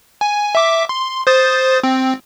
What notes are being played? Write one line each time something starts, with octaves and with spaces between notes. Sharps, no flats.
G#5
E5 D6
C6
C5 D#6 A6
C4